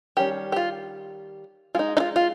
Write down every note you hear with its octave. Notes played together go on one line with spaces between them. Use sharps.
D#3 G3 C#4 G4
G4
F4
G#3 D#4 F4
D#4
F4
F4